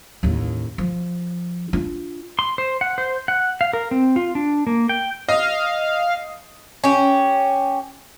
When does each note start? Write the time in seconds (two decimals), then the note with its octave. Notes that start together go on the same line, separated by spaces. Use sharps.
0.23 A1 D#2
0.78 F3
1.73 D4 F4
2.39 C6
2.58 C5
2.81 F#5
2.98 C5
3.28 F#5
3.61 F5
3.73 A#4
3.91 C4
4.16 F4
4.35 D4
4.67 A#3
4.89 G5
5.28 D#5 F5
6.84 C#4 G4